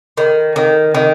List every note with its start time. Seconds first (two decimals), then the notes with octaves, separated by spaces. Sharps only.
0.17 D#3
0.56 D#3
0.95 D#3